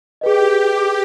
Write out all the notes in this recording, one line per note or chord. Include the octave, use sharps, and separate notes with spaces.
G4 G#4 B4 D#5